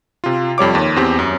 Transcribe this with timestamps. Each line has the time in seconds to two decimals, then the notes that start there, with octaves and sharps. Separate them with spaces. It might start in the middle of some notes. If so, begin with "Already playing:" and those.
0.24 C3 F4
0.58 F2 G3 C#5 D6
0.75 D#2
0.96 E2 C4 G4
1.19 F#2